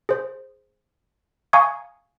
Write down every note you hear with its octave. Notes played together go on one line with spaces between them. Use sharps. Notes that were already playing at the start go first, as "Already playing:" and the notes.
G#4 C5
F5 G#5 A#5 C#6 D#6 G#6